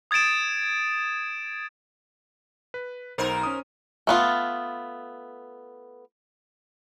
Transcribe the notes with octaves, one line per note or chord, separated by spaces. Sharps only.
D#6 G#6 A6 D7 E7
B4
B1 D#4 A#4 C5
C#4 D#6
A3 B3 F4